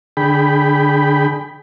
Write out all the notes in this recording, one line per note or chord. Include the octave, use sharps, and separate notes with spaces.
D3 G#4 G5 B5